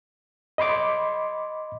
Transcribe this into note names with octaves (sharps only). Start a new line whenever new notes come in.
D#5 B5 C6 D6